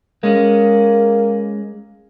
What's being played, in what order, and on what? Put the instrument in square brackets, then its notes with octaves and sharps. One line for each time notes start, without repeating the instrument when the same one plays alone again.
[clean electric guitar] G#3 C#4 [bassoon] A#3